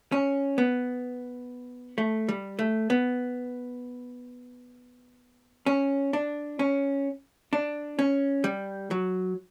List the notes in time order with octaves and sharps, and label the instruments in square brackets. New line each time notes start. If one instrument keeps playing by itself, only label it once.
[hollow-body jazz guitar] C#4
B3
A3
G3
A3
B3
C#4
D4
C#4
D4
C#4
G3
F#3